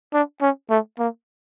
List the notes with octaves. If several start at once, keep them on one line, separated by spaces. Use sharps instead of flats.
D4
C#4
A3
A#3